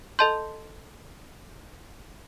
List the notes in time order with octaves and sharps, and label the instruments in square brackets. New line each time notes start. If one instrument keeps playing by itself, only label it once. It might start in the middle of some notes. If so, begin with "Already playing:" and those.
[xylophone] A4 D#5 A5 C6 G6